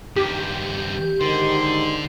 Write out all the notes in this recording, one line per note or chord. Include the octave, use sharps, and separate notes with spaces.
G2 D#3 G4
G#2 D3 D#3 C6